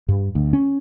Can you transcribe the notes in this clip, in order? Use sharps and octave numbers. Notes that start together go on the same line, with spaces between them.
G2
D2
C#4